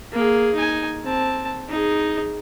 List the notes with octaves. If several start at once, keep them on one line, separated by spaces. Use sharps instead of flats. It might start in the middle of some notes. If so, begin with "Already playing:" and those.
A#3 G#4
D#4 G#5
C4 A5
D#4 G#4